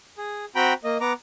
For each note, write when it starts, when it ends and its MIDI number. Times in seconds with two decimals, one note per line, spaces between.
0.18 0.45 68
0.55 0.73 60
0.55 0.73 66
0.55 0.73 79
0.55 0.73 82
0.55 0.73 83
0.84 0.98 58
0.84 0.98 75
1.01 1.13 59
1.01 1.13 82
1.01 1.13 86